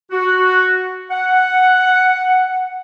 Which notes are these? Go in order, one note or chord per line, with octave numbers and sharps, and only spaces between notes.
F#4
F#5